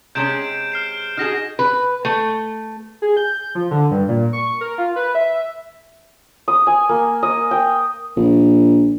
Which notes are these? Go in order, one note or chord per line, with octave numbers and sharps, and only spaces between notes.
C3 G#3 C#4 G6 D7 E7
F6 C7 E7
D#4 F#4 G#4 F6 A#6 E7
B4
A3
G#4
G6
F3
D3
G2
A#2
C#6
A#4
F4
B4
E5
D#6
G#5
A#3
D#5
G5
A#1